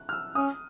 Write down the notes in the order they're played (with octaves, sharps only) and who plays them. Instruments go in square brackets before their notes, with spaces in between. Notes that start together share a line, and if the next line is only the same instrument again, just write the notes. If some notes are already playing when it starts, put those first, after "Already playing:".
Already playing: [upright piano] F#6
F6
E6
[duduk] C#4 [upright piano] D#6